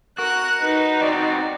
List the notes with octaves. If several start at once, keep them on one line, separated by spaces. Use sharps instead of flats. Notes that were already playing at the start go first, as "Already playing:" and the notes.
F#4 A#4 F#6
D#4 B4
C4 F#4 D5